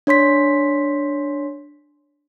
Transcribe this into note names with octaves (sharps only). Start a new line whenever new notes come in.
D4 C#5 C6 B6